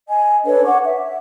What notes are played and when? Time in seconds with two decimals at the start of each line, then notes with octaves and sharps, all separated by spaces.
0.09 D#5 G#5
0.45 D4 A4 B4 C#5
0.65 C#5 F#5 C#6 D6
0.84 E5